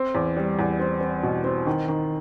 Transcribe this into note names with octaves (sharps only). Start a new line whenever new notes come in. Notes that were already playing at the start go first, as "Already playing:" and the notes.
Already playing: C4
E2
G3
E2
C4
C4
B2
C4
D#3
D#3